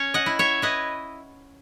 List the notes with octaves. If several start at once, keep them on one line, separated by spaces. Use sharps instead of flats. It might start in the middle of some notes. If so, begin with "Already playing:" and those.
Already playing: C#4 C#5
D#5 F#5
E4
C#5 E5
E4 B4 D#5